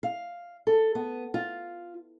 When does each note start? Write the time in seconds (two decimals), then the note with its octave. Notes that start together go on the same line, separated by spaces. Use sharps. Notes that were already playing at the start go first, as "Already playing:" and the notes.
0.03 F5
0.67 A4
0.95 B3
1.34 F4